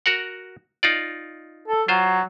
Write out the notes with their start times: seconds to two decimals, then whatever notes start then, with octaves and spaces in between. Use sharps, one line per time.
0.06 F#4 A#4 F#5
0.83 D#4 F4 D5
1.68 A4
1.88 F#3 F4 C5